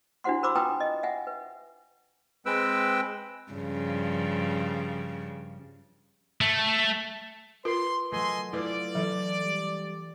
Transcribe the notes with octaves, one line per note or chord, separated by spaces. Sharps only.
D4 E4 F#4 C5 F#5 C6
A#4 C5 B5 C6 D6 E6
F4 B4 G5 G#5 A#5 D#6
D#5
E5 F#5 G#5
B4
G#3 C4 B4 G5 E6
G2 C#3 F3
A3
F4 A#4 B4 C6
F#3 A3 D#5 G#5 C6
A3 E4 F4 B4 D5
E3 F#3 A4
G3